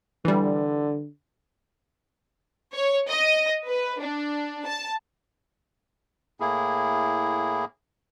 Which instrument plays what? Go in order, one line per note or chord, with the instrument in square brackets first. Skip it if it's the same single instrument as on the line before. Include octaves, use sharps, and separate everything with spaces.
[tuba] D3 [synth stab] E3 G3
[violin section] C#5
D#5
B4
D4
A5
[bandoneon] A2 A#3 E4 G#4